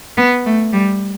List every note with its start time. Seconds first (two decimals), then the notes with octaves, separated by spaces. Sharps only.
0.17 B3
0.46 A3
0.73 G3